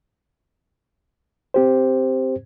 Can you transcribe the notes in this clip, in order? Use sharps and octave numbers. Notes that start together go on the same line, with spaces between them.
C4 G4 C5